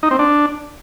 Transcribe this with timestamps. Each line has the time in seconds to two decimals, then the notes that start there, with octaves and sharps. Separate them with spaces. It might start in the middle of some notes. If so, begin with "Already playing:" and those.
0.03 D#4
0.11 C4
0.19 D4